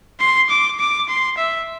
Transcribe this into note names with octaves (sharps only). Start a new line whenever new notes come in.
C6
D6
D6
C6
E5